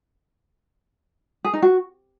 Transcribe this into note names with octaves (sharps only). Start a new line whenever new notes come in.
G#4
D#4
F#4